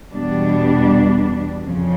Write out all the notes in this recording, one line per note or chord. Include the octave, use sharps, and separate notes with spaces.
E2 B2 G3 B3 D4
F2 C#3 F3